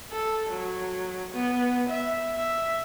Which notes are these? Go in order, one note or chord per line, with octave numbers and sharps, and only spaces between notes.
A4
F#3
B3
E5
E5